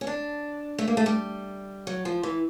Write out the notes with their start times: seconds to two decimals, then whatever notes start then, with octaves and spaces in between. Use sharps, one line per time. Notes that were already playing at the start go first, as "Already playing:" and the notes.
0.01 C#4
0.07 D4
0.78 A3
0.88 A#3
0.97 A3
1.06 G3
1.87 F#3
2.05 F3
2.23 E3